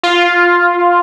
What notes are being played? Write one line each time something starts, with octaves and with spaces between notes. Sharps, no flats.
F4